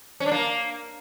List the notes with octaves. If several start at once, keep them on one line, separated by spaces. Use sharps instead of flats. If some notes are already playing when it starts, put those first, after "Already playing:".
C#4
D4
A#3